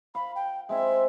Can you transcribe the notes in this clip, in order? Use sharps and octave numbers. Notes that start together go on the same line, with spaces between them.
F5 B5
G5
G#3 C4 E4 E5